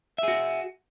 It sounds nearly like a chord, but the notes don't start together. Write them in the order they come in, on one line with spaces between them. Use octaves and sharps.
E5 G#4 F#4